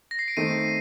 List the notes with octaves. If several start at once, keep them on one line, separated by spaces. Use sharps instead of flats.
A#6
C7
D7
D#3 A3 C4 D#4 C7 D#7